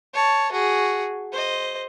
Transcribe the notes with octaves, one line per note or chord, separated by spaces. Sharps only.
C#5 A5
F#4 G#4
C5 D#5